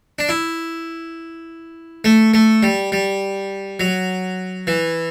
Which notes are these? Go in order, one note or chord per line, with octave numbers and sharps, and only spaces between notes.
D4
E4
A3
A3
G3
G3
F#3
E3